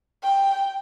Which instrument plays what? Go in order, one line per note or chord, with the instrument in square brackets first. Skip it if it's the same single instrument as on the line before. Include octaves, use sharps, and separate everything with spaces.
[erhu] G5